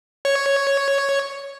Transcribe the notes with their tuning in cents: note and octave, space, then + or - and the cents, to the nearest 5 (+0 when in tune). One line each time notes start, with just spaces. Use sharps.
C#5 +0